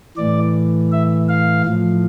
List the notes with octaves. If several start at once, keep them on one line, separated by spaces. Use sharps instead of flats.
A2 E3 D5
E5
F5
A2 F3